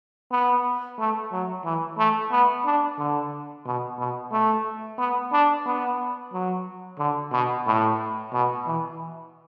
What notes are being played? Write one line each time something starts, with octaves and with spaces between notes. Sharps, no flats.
B3
A3
F#3
E3
A3
B3
D4
D3
B2
B2
A3
B3
D4
B3
F#3
D3
B2
A2
B2
E3